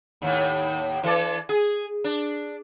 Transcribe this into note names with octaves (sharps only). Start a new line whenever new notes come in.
D#2 A2
E3 A4 D5
G#4
D4